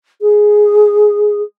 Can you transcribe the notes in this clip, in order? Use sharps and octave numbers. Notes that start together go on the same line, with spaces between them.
G#4